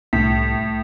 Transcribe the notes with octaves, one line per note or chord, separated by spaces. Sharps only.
C2 A2 B6